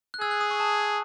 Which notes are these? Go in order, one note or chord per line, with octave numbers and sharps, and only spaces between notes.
F#6
G#4 E6 G#6
F#6
D#6
C#6
A5